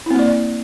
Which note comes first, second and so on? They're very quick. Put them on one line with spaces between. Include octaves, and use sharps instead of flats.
E4 C4 A#3 D5